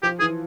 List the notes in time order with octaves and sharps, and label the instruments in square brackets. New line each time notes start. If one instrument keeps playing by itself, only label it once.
[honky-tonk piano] F3 [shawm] G4
[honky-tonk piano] E3 [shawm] G#4